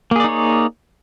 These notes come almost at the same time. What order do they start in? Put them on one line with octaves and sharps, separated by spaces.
A#3 G#4 D5 D#4 C#5